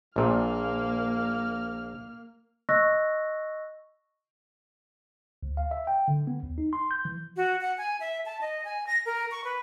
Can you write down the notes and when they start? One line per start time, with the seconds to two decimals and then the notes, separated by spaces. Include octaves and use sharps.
0.16 A#1 A#2 A#3 F6
2.69 D#5 C#6 E6 F#6 A#6
5.43 D2
5.57 F5
5.71 E5
5.87 G5
6.08 D3
6.27 B3
6.43 D#2
6.58 D#4
6.73 C6
6.91 G6
7.05 E3
7.37 F#4
7.61 F#5
7.78 G#5
8.00 E5
8.26 A5
8.41 D#5
8.65 G#5
8.87 A#6
9.06 A#4
9.31 C#6
9.44 B4